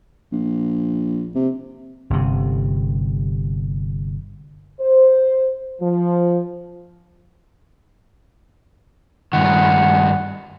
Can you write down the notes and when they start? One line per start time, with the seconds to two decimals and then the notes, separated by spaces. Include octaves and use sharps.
0.32 A#1
1.35 C3
2.10 G1 C3
4.80 C5
5.82 F3
9.33 G2 D#3 F#5